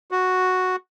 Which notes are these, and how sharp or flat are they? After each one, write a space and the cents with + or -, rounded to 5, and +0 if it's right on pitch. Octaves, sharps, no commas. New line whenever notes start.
F#4 -5